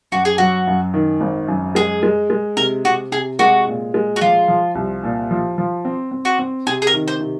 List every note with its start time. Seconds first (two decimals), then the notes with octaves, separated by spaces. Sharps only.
0.12 F#2 F#4
0.25 G#4
0.38 F#3 F#4
0.67 F#2
0.94 D#3
1.21 G#1
1.48 F#2
1.75 G#3 G#4
2.03 G#3
2.30 G#3
2.57 C3 A#4
2.85 C3 F#4
3.12 C3 G#4
3.39 G#3 F#4
3.67 A#2
3.94 G#3
4.16 F#4
4.21 F3 F4
4.48 F3
4.75 C2
5.03 A#2
5.31 F3
5.58 F3
5.85 C4
6.11 C4
6.25 F#4
6.39 C4
6.67 C3 G#4
6.82 G#4
6.87 A#4
6.94 D#3
7.08 C5
7.21 C3